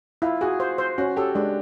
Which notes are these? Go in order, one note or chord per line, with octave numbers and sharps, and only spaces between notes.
E4 F4
F#4 G#4
C5
C5
C#4 F#4
G4 A4
G#3 D4